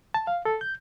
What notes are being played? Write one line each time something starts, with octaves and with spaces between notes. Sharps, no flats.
A5
F5
A4
G6